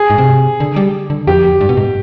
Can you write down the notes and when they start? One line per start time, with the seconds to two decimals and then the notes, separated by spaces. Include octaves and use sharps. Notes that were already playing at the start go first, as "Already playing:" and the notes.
Already playing: G#4
0.10 G#2
0.18 C3
0.60 D3
0.76 G3
1.10 D3
1.27 F2 G4
1.61 G2
1.69 B2
1.77 G#2